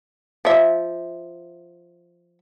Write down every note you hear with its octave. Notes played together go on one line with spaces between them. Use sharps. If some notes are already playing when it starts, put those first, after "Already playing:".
F3 E5